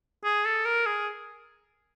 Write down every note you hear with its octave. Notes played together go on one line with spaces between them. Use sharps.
G#4
A4
A#4
G#4